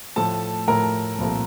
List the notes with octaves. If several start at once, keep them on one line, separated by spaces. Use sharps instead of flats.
A2 F3 A3 A4 A5
A2 F3 A3 A#4 A#5
C2 A#2 F3 A3